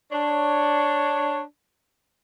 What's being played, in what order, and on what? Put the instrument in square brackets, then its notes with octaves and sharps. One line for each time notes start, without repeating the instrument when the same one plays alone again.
[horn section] D4 C#5